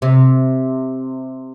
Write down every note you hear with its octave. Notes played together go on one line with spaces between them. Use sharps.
C3